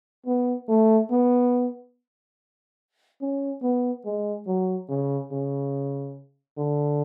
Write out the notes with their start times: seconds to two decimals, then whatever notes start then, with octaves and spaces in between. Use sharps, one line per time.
0.26 B3
0.69 A3
1.11 B3
3.21 C#4
3.62 B3
4.05 G#3
4.47 F#3
4.89 C#3
5.32 C#3
6.58 D3